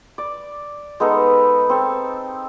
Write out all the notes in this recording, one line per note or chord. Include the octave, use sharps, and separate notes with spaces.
D5
G#3 B3 D#4 A4
C4 A4